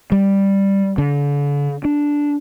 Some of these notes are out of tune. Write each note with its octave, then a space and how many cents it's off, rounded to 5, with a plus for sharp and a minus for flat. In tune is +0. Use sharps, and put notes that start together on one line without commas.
G3 +5
D3 -40
D4 -5